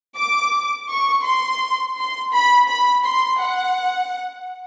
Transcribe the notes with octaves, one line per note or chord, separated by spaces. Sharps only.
D6
C#6
C6
C6
B5
B5
C6
F#5